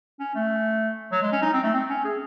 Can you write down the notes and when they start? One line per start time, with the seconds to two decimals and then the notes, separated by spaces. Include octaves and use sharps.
0.19 C#4
0.35 A3
1.12 F#3
1.22 G#3
1.32 C#4
1.42 D#4
1.53 C4
1.63 A3
1.73 C4
1.89 C#4
2.04 G#4